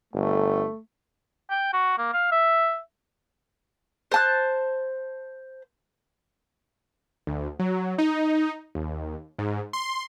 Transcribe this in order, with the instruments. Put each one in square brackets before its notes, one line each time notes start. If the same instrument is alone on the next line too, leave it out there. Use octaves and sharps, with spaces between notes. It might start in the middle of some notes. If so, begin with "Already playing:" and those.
[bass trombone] G1 [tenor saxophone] A3
[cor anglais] G5
F#4
A#3
F5
E5
[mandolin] C5 A5 F#6
[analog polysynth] D2
F#3
D#4
D#2
G#2
C6